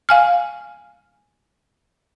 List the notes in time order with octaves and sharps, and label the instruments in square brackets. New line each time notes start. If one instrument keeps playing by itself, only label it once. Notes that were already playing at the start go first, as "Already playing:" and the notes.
[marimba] F5 G#5 F6